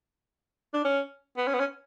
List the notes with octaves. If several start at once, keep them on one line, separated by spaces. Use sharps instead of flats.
D4
C#4
B3
C#4
B3
C#4